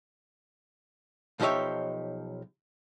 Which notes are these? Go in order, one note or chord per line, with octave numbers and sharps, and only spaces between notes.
B1 F3 D#4 G4 C#5 E5